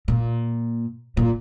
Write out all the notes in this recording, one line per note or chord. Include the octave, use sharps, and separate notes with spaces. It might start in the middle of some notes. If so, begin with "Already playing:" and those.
A#2
A#2